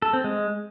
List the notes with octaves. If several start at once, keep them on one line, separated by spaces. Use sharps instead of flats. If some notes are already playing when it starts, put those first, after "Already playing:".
A4
C4
G#3